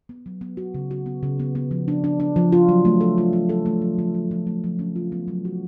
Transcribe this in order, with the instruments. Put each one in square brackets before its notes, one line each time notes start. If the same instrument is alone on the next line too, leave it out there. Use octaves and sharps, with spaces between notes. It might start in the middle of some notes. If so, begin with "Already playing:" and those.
[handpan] B3
F#3
B3
F#4
C#3
F#4
B3
C#3
B3
B3
F3
D4
D4
D4
F3
F4
F#3
A3
A4
F4
F4
A4
A3
F3
F3
F4
F3
A3
F3
C#4
F4
B3
F#3
F#4